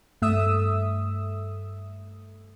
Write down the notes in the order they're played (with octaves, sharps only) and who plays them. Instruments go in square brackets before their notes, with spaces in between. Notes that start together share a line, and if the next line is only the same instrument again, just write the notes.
[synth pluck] G2 A3 E5 D#6 E6